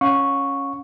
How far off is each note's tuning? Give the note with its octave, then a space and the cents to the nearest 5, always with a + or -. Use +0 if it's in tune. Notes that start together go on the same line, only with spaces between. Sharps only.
C#4 -5 F5 +45 C#6 +0